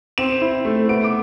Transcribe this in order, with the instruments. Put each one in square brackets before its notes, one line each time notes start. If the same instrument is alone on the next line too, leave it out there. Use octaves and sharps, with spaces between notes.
[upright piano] C4 E7
E4
A3
B3 D7
D6